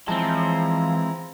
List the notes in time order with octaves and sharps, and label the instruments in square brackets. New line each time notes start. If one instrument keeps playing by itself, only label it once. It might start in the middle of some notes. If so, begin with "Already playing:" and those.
[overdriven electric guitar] E3 A5 [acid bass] F3 [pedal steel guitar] G#3 C4 [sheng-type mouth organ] E4 A#5